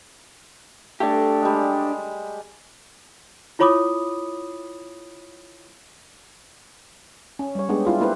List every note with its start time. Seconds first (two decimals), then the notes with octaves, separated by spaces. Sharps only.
1.00 A3 D4 G4
1.42 G3 G#3
3.59 E4 F4 C#5 B5 D6 D#6
7.39 C#4
7.55 G3 C#5
7.69 G#3 B3 D4 G4 G#4
7.85 E4 F4 G4
8.00 A#3 E4 G4 B4 C5